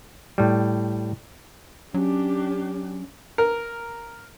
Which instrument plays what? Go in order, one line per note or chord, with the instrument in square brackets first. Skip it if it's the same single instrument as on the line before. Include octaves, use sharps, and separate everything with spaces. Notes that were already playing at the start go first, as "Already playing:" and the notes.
[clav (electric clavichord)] A2 G3
[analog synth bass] F#3 [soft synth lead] C#4 [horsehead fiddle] D4 G4
[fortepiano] A#4